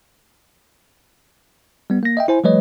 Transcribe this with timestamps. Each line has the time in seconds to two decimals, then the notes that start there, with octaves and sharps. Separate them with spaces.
1.90 G3 B3
2.03 A#3 A#6
2.17 D#5 E5 G5
2.28 E4 C5 G#5
2.44 F3 G3 A3 B4 C#5 D#5